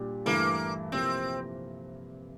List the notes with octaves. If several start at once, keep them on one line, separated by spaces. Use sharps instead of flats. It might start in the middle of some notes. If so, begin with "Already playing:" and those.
Already playing: A#2 G3 D4 G4
G2 E3 A3 A#3 E4 A4
C3 F3 A#3 C4 E4 G4